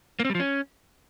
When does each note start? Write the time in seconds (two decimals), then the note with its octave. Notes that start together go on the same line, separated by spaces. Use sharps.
0.20 A#3
0.25 C4
0.30 G3
0.35 F3
0.40 C#4